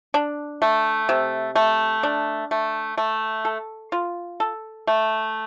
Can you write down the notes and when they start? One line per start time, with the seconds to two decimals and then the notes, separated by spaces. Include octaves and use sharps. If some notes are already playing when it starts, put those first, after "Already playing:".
0.14 D4
0.62 A3
1.09 C3
1.55 A3
2.03 D4
2.51 A3
2.97 A3
3.45 A4
3.92 F4
4.40 A4
4.87 A3